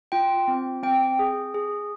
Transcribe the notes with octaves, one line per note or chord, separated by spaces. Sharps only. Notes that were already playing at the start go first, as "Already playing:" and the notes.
F4 G5
C4
C4 G5
G#4
G#4